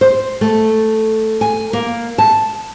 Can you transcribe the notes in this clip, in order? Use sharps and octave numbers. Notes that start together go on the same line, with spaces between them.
C5
A3
G#5
A#3
A5